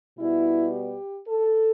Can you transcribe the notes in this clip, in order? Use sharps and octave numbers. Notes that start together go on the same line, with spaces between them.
B2 G3 B3 E4
G4
A4